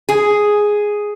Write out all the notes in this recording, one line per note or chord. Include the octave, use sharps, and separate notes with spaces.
G#4